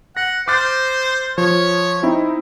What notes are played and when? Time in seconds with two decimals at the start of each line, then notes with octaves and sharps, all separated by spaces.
0.17 F#5 A#6
0.48 C5 D6 F6 A6
1.38 F3 C#5
2.03 C4 D#4 E4